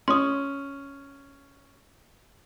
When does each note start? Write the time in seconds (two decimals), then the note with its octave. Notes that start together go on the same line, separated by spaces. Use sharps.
0.08 C#4 C6 D#6